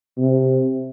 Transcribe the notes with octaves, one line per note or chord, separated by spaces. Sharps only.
C3